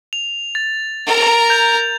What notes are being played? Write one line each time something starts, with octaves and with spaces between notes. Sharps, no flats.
F7
A6
A#4 A#5
G6 F7